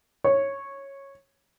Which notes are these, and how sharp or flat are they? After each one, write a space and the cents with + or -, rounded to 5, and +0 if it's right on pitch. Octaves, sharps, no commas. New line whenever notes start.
C#5 -10